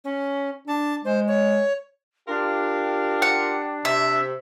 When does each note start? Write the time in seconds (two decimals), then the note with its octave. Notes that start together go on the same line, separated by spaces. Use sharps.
0.04 C#4
0.68 D4 A5
1.05 G#3 C5
1.28 C#5
2.28 D4 F4 G4 A#4
3.22 F#5
3.85 C3 E5